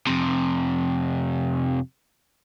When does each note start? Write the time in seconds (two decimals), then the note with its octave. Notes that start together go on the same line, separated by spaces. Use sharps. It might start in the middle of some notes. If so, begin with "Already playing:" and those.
0.07 F2 C3